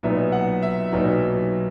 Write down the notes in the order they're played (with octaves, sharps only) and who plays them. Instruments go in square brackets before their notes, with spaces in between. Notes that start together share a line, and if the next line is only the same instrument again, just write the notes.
[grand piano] B1 A#2 F#3 B3 D#4 E5
F#5
E5
B1 A#2 F#3 B3 D#4